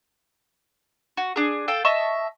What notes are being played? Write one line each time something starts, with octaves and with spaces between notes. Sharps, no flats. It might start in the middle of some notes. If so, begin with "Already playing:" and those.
F#4
D4 G#4
F4 A4 G5
D#5 E5 A5 C#6